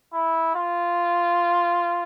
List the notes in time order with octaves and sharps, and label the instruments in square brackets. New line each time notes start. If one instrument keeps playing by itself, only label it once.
[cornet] E4
F4